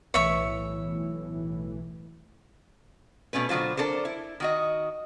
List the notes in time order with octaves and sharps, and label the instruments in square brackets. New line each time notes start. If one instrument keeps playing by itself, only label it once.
[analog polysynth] B1 A2 E3 [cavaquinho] C#5 E5 C#6
[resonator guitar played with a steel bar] B2 A3 C#4 B4
B2 D3 F#3 F4 C5
D4 A4 A#4 C5
E4
D#3 F#4 D#5